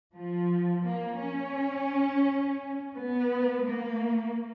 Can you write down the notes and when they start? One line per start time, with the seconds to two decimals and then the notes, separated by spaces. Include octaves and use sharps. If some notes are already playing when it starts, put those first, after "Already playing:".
0.16 F3
0.85 A#3
1.20 C#4
2.94 B3
3.63 A#3